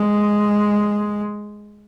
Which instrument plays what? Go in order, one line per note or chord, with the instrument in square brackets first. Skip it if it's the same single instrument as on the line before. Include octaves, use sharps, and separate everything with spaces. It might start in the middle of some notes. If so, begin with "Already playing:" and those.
Already playing: [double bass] G#3